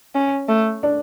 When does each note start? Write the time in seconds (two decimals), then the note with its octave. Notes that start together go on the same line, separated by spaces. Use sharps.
0.15 C#4
0.48 A3
0.83 D4